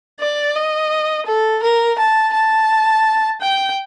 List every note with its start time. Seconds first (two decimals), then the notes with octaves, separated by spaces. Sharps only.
0.20 D5
0.56 D#5
1.26 A4
1.63 A#4
1.99 A5
2.33 A5
3.41 G5